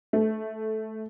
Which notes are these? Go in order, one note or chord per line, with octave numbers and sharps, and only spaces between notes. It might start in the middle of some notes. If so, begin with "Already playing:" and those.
A3